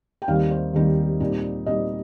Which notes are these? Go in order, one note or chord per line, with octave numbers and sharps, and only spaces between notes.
G5
D#2 D#3 G3 C4 D#4 F5
C5
D#2 D#3 G3 C4 D#4
A#2 G3 C4 D#4
A#2 G3 C4 D#4 D#5